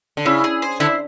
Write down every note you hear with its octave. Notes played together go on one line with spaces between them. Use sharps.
D3
C#3 E4
G#4
C5
D3 E4